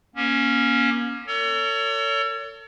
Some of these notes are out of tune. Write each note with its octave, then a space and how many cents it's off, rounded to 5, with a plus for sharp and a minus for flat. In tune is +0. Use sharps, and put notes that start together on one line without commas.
A#3 +35 C#4 +0
A4 +40 C#5 +35